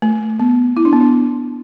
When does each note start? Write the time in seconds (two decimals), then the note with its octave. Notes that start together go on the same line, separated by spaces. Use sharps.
0.02 A3
0.40 B3
0.77 E4
0.85 D4
0.93 B3
1.01 D4